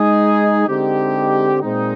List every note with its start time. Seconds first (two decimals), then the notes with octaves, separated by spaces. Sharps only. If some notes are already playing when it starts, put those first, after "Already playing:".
Already playing: G#3 D#4 G#4
0.66 D3 G#3 C4 D#4 G4
1.62 A#2 G#3 C4 D#4